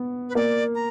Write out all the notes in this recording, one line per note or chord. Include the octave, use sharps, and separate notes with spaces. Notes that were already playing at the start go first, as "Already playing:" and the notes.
Already playing: B3
B4
A#3 D5
A#5